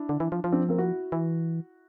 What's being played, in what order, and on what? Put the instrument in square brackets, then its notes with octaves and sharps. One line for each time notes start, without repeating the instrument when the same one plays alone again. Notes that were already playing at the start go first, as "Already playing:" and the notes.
Already playing: [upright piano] D4 E4
[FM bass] D3
E3
F3
F3
[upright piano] C4 D4
A#3 C4
E4 F#4
[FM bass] E3